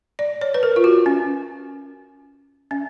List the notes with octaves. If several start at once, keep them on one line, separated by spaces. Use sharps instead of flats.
D5
C#5
B4
A#4
F4
F#4
C#4
C#4